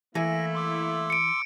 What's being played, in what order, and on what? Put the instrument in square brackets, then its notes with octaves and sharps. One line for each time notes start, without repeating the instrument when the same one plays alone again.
[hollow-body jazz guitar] E3 G#5 [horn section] A3 A#3 E4 [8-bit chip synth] A#6
[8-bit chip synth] C6 D6 E6
[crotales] C#7 D7